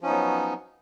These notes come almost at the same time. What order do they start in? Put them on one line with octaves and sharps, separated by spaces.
F3 C#4 D#4 B3 F#3